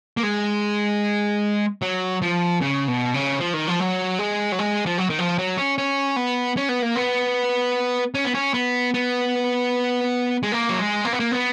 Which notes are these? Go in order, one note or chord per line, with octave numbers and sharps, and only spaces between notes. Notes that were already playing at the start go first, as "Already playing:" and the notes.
A#3
G#3
F#3
F3
C#3
B2
C#3
F3
D#3
F3
F#3
G#3
F#3
G#3
F3
F#3
D#3
F3
F#3
C#4
C#4
B3
C#4
B3
A#3
B3
C#4
B3
C#4
B3
B3
G#3
A#3
F#3
G#3
A#3
B3
A#3
B3